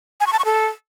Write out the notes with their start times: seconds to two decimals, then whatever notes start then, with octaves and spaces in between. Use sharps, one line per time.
0.20 G#5
0.27 C#6
0.33 A5
0.39 C#6
0.45 A4